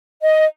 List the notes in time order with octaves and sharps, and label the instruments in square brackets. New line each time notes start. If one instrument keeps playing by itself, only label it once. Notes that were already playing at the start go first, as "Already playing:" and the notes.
[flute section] D#5